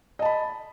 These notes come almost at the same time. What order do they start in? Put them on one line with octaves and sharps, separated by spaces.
D#5 A5 B5